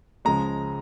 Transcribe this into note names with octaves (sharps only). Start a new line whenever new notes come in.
C#2 C#3 F3 G#3 A#5